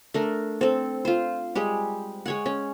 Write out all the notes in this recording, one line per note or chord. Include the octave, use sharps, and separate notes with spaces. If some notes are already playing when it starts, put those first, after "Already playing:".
A3 D4 A#4
C4 A4
F4 C5
G3 G#3 G4
G#3 C#5 F#5
C#4